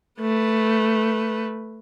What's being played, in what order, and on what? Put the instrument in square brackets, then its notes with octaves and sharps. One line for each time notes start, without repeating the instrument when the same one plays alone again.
[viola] A3 B4